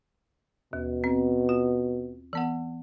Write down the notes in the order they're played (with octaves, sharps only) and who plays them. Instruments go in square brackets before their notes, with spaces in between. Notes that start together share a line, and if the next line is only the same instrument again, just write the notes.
[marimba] D#2 [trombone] B2
[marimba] C4
F4
E3 B3 F#5